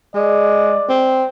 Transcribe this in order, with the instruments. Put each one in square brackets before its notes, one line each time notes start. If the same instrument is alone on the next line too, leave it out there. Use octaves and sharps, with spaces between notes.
[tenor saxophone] G#3 [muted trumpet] D5
[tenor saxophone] C4